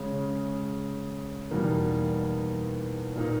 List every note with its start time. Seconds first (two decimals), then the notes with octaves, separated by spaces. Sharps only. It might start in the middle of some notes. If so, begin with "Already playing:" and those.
Already playing: C#3 G#3 C#4
1.51 E2 B2 G3 A#3 D#4
3.16 A#2 A#3 D#4